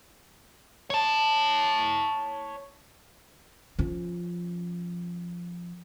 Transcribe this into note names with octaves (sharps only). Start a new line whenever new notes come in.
C#5 A5
F3 C#4